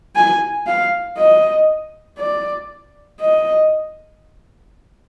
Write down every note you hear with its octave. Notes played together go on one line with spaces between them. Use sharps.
G#5
F5
D#5
D5
D#5